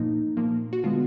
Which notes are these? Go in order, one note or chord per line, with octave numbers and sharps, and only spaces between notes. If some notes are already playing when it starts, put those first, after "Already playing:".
Already playing: A#2 F3 A#3 D#4
A#2 F3 A#3
F#4
D3 G#3 B3 F4